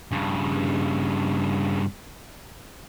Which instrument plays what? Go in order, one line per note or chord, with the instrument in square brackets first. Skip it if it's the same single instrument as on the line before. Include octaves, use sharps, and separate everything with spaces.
[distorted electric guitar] G2 C#3